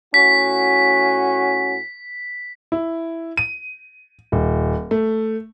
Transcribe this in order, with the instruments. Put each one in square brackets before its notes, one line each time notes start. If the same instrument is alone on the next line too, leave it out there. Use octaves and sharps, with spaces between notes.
[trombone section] A2 C#4 F#4 [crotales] B6
[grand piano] E4
D#7
D#1
A3